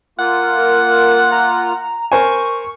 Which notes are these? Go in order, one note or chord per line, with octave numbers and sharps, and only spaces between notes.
A#3 F4 F#5
A#4
A#5
A#4 C5 G#5 C#6